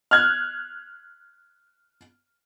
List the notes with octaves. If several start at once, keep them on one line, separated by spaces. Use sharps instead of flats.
F6 F#6 G#6